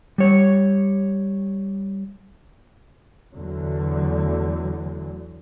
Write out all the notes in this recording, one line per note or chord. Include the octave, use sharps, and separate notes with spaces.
G3 C#5
E2 D3 F#3 A3